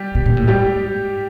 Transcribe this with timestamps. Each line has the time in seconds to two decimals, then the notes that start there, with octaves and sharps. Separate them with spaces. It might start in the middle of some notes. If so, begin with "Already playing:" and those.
Already playing: G3 G4
0.15 B2
0.26 A#2
0.37 A2
0.47 G#2 G3 G4